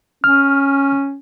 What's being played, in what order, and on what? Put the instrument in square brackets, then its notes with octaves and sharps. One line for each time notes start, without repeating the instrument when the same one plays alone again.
[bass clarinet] C#4 [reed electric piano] F6